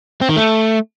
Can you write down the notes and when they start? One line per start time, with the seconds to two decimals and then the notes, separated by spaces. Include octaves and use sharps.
0.21 C4
0.29 D#3
0.36 A3